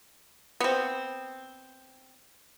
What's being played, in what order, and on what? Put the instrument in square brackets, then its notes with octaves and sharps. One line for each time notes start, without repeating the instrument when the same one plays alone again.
[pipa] B3 C4